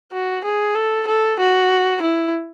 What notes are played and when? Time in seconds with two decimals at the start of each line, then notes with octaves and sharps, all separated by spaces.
0.12 F#4
0.44 G#4
0.75 A4
1.07 A4
1.39 F#4
2.02 E4